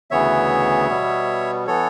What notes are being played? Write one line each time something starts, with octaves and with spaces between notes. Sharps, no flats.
D2 C#3 E3 B3 C#5 E5
B2 G3 B3
E3 B3 A4 C#5